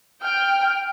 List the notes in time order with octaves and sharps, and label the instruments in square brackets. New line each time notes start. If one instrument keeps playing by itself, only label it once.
[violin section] G5 [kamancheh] F6